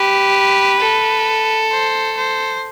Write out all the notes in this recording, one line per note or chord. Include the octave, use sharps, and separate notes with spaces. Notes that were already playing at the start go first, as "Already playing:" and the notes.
Already playing: G4 B4
A4
C5
C5